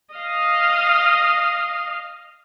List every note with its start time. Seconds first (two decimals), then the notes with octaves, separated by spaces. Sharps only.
0.14 D#5 F5